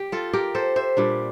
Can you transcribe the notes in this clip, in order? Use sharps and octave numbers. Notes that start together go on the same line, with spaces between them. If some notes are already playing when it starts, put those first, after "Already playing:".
Already playing: G4
F4 A4
G4 A#4
A4 C5
C5 E5
A#2 G3 D4